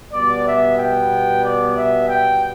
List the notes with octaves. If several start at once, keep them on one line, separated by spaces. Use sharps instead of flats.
B2 G3 B3 D5
E5
G5
D5
E5
G5